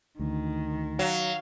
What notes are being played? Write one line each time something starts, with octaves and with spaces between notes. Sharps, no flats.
D2 D#3
F#3 F5